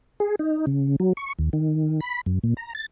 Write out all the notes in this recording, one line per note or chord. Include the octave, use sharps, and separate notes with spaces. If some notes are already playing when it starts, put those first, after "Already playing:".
G#4
D#4
C#3
F#3
C#6
D#2
D#3
B5
F#2
A#2
A#5
A6